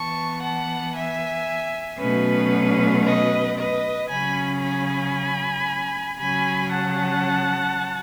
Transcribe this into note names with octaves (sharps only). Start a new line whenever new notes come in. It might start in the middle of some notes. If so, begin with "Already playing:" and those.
Already playing: E3 B3 A5 C#6
F#5 A5
E5 G#5
B2 F#3 A3 C#4 B4
B4 D#5
B4 D#5
C#3 F#3 C#4 G#5 B5
G#5 B5
C#3 F#3 C#4 G#5 B5
F#5 A5